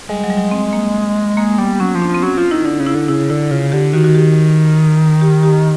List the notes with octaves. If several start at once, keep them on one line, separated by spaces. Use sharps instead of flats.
G3 G#3
F#3
G3
F#3
C4
A#3
G#3 A#3
A#3
G3 B3
F#3 C#4
F3
D4
F3
C4
F#3 C#4
F3 F4
D#3 E4
D3 D#4
C#3
E4
D3
C#3 E4
D3 E4
C#3 F4
D3 G4
D#3 F#4
F#4
G4
G4
G4